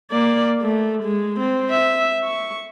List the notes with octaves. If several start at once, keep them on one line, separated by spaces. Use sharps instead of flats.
A#3 D5
A3
G#3
C4
E5
C#6